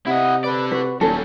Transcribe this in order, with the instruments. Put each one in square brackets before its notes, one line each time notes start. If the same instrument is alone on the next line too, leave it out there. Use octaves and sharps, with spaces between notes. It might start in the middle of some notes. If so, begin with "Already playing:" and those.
[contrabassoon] C3 [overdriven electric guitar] E4 D#5 [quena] F#5
[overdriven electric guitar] A4 D5 [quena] B4
[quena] F#4 [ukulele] B4
[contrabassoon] D#1 [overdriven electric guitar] F#3 G3 [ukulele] A4 [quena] G#5